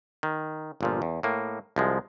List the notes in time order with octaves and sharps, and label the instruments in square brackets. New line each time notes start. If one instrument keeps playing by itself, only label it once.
[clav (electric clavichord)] D#3
G1 A#2 F3
E2
A2 A#3
C2 F3 G#3